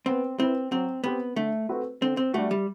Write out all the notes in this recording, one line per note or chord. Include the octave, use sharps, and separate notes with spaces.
B3 C4
C4 E4 B4
F#3 C4
B3 C4 G4 B4
D3 A3
A3 C4 F#4 B4
D3 C4
C4
G3 A3 D4 F#4
G3